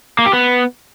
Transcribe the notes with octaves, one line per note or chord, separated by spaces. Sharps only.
A#3
G4
B3